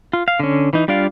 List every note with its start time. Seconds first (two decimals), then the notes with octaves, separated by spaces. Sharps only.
0.13 F4
0.28 F5
0.40 D3 C#4
0.73 E3 D#4
0.88 G3 D4 F4 D5 F5